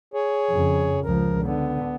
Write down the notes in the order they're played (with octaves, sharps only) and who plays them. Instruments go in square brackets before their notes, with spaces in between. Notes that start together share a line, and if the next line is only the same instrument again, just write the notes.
[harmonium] G#4 C#5
[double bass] F2 C#3
[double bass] C#2 F3 [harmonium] A#4
[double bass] D3 [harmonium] B3